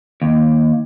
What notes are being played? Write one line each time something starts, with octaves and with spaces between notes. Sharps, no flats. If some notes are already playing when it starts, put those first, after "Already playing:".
D#2